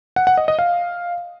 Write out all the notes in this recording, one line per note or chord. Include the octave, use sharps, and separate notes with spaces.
F#5
F#5
D#5
D#5
F5